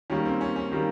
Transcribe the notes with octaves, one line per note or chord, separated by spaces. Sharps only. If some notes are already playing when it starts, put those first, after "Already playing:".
D#3 G3 A#3 C#4
C4
C#4
C#4
D#3 G3 A#3